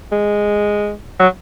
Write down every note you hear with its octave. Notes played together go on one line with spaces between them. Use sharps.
G#3
F#3